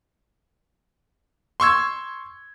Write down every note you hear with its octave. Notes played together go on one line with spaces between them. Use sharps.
C6 C#6 E6 G#6